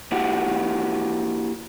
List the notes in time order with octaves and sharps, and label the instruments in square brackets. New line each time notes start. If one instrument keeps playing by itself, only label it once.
[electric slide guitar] A#3 E4 F#4 G4 F#5 G5